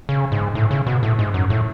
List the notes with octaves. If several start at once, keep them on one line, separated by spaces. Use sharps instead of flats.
C#3
G#2
A2
C#3
B2
A2
G#2
F#2
A2